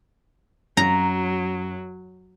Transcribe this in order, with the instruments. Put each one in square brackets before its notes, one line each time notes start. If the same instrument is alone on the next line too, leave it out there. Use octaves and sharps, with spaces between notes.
[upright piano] F#2 [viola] F#3 [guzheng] A#5